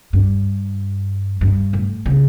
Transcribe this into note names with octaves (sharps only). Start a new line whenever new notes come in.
G2
G2
A2
C#3